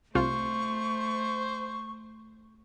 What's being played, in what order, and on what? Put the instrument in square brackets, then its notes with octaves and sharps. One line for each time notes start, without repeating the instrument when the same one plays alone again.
[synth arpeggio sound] C2 F4 [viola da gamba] A3 [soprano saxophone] C5 [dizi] C#6